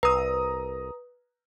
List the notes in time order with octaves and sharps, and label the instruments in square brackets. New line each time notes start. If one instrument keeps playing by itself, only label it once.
[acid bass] C2 [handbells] B4 [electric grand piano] A#5 D#6